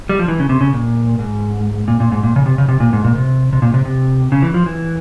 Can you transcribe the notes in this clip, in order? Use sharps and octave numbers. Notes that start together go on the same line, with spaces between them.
G3
F3
E3
C#3
C3
C#3
A#2
G#2
A#2
A#2
G#2
A#2
C#3
C3
C#3
C3
A#2
G#2
A#2
C3
C3
A#2
C3
C3
C#3
E3
F3
E3